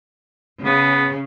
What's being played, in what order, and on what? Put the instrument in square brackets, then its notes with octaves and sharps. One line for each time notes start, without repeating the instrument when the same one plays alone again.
[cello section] C#3 [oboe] B3